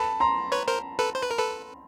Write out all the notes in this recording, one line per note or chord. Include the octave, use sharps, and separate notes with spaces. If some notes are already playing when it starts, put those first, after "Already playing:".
Already playing: A4 B4 A5 B5
A#5 C6
B4 C#5
A#4 C5
A4 B4
C5
B4
A#4
A4 B4